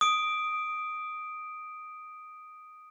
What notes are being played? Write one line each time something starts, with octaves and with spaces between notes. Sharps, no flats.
D#6 D7